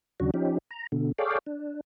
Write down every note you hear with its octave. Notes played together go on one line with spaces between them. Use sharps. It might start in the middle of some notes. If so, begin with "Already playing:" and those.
D#2 C#3 F#3 D4 F#4
F3 C#4 D#4 G4
A#5
B2 D3
G#4 A4 C#5 D5 F5 G5
D4